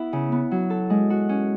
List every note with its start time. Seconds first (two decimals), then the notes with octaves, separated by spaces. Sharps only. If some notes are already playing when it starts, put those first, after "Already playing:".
Already playing: B3 E4
0.13 C#3
0.32 B3
0.51 F#3
0.70 A4
0.90 G#3
1.10 F#4
1.29 C#4